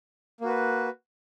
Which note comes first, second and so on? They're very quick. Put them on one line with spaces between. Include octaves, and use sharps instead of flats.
A#3 F#4 B4